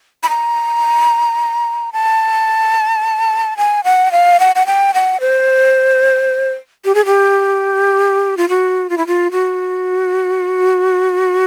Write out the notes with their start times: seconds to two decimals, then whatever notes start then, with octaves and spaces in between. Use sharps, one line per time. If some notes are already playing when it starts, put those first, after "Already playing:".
0.23 B5
0.29 A#5
1.93 A5
3.57 G#5
3.84 F#5
4.12 F5
4.40 F#5
4.56 F#5
4.67 G5
4.94 F#5
5.21 C5
6.85 G4
6.95 G#4
7.06 G4
8.37 F4
8.49 F#4
8.90 F4
8.98 E4
9.07 F4
9.31 F#4